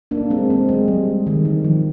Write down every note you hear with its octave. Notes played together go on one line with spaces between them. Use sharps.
A#3 D4
G#3 C4
G#3 C4
G#3
G3
D#3
D#3
F3